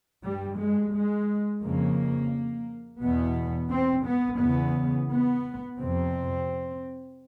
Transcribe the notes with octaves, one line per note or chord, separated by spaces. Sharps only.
G2 G3
G#3
G#3
F2 C#3 A#3
E2 B2 B3
C4
B3
E2 C#3 B3
B3
F2 C3 C4